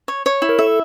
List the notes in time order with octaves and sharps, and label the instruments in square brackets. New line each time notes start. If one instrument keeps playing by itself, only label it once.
[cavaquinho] C#5
C#5
E4
[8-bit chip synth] A#4
[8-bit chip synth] A4 [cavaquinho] E5